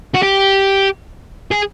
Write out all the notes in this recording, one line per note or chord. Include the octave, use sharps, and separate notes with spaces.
F#4
G4
G#4